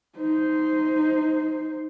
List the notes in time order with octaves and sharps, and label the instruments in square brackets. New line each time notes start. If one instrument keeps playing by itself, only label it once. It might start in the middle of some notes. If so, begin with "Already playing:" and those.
[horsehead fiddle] D#4 C5